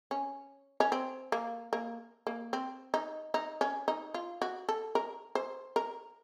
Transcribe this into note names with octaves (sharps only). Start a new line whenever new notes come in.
C#4
C#4
C4
A#3
A#3
A#3
C4
D#4
D#4
C#4
D#4
F4
F#4
A4
A#4
C5
A#4